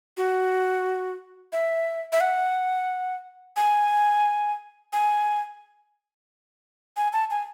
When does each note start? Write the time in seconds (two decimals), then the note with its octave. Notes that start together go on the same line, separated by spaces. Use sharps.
0.17 F#4
1.53 E5
2.12 E5
2.21 F#5
3.56 G#5
4.93 G#5
6.97 G#5
7.13 A5
7.31 G#5